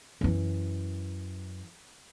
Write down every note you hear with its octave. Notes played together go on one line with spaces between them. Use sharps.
F#2 E3